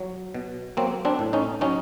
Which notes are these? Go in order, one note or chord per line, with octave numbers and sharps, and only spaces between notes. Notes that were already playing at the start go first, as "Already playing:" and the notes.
Already playing: F#3
B2
F#3 A#3 C4
C4 D4
A2
C#4 D#4
F#3 C#4 D#4